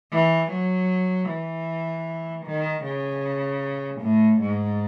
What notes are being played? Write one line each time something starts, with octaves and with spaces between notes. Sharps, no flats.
E3
F#3
E3
D#3
C#3
A2
G#2